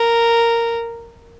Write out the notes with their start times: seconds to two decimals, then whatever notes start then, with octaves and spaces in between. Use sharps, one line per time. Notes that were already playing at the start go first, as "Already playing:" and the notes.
Already playing: A#4